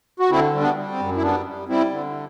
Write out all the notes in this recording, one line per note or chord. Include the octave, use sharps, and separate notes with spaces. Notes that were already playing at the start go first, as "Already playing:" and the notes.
F#4
D3 C4 E4
G3
B3 D4
G3
C4
F#2
E4
G3 B3 D4
G3
G3 C4 E4
D3